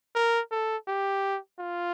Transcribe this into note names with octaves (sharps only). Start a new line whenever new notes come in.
A#4
A4
G4
F4